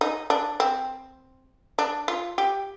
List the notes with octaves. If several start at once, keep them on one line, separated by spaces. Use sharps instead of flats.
D#4
D4
C4
D4
F4
G4